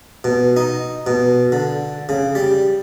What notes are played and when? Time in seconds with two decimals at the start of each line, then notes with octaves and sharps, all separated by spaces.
0.24 B2
0.57 D#4
1.07 B2
1.52 D3
2.09 C#3
2.35 G3